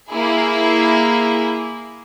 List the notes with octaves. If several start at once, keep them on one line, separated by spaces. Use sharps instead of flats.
A#3 E4 G#4